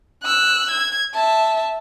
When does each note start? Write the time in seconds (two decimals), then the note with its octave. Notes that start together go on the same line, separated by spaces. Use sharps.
0.23 E6 F#6
0.70 G#6
1.14 E5 A5